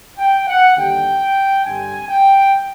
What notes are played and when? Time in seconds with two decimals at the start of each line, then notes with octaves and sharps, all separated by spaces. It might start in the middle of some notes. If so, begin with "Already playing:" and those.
0.18 G5
0.47 F#5
0.76 D#2 D3 G3 G5
1.65 G2 D3 G3 C4 G#5
2.08 G5